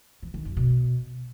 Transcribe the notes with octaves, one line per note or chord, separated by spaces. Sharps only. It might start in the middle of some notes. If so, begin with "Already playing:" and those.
E3
D#3
F#2
B2